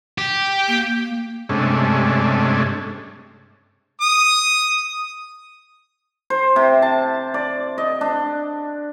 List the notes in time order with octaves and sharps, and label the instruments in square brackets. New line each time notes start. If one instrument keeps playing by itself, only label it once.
[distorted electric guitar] G4
[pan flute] A#3
[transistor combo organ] G2 C3 G#3 A3 C#4 D4
[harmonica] D#6
[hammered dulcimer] C5
C3
A5
D5
D#5
D4